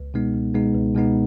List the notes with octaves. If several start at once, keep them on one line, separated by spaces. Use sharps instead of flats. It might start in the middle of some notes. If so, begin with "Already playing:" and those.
Already playing: C#2
B2 G#3 B3 D#4
C#2
B2 G#3 B3 D#4
C#2
B2 G#3 B3 D#4